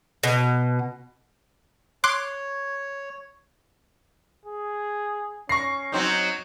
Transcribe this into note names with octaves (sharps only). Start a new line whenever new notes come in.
B2
C#5 C6 D6 F#6
G#4
C#4 C#6 A#6 C7
F#3 C4 D#4